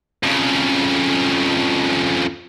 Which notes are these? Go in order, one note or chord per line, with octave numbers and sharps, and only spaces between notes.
F2 C#3